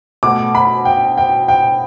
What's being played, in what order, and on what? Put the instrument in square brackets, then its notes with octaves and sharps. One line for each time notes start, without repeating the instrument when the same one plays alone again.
[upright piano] B2 A3 D6
B5
G5
G5
G5